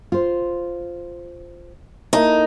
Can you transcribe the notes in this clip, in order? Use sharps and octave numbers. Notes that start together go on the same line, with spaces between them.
F4 C5
A#3 D#4 E4 A4